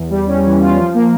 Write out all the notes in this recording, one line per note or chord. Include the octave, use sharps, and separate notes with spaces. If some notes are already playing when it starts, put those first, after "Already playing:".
Already playing: E2
G3
C#4
E3
F4
F3
A#3